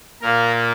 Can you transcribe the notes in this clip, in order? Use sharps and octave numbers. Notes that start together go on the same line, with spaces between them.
A#2 A#3 A#4